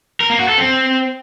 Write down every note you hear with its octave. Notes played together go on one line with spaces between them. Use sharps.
A#4
A#3
F#4
A4
C4